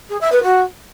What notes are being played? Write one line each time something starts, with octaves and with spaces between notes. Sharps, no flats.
G#4
E5
B4
F#4